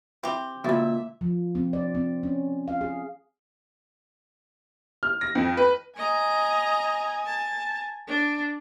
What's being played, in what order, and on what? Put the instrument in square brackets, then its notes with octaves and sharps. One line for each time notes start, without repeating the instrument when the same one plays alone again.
[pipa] C4 G4 [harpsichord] E4
[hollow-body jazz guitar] C#2 A#2 [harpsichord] E4 F#4 D5 [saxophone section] E5
[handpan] F3
C4
D5
C4
C#4
F5
G#4
[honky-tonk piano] F6
A#6
F2
B4
[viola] D#5 A#5 [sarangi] G#5
[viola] A5
D4